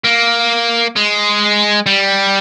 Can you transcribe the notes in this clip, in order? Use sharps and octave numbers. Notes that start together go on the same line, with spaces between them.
A#3
G#3
G3